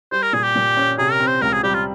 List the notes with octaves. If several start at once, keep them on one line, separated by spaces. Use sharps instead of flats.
G3 C5
A#4
A#2 G#4
G4
A#2
C#4
C3 G#4
A#4
C4
C5
C#2 A#4
G#4
G3 G4
F4